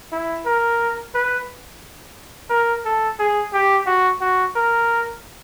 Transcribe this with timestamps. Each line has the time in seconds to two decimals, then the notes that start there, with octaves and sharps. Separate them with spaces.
0.12 E4
0.46 A#4
1.15 B4
2.50 A#4
2.85 A4
3.19 G#4
3.53 G4
3.86 F#4
4.21 F#4
4.56 A#4